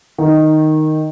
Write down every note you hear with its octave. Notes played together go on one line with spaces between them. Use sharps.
D#3